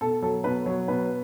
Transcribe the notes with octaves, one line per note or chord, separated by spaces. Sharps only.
B2 A4
F#3 A4
B2 B4
F#3 C#5
B2 B4